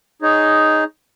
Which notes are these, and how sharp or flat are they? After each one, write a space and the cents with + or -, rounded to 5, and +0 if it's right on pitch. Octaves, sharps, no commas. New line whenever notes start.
D#4 +0 G#4 +0 C#5 +0